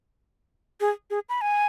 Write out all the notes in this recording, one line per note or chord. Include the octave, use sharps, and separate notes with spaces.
G#4
G#4
B5
G#5